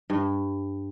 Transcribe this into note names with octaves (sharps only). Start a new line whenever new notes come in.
G2